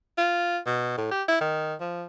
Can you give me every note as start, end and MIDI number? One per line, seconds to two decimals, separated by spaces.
0.18 0.58 65
0.66 0.94 47
0.98 1.10 45
1.11 1.23 67
1.28 1.38 64
1.41 1.75 51
1.80 2.05 53